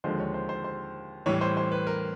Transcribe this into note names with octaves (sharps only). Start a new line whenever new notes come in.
D#2 D3 F3 G#3 C5
C#5
C5
C5
C5
A2 E3 G3 C#5
C5
C5
B4
A#4